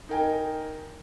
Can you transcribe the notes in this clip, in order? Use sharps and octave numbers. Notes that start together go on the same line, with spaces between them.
D#4 A#4 G5 G#5